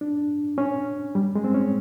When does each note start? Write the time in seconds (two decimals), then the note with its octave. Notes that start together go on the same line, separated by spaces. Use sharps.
0.01 D4
0.58 C#4
1.15 G3
1.35 G#3
1.44 C4
1.55 C#4